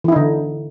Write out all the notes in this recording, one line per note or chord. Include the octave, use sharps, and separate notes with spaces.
D3 E3 D#4 E4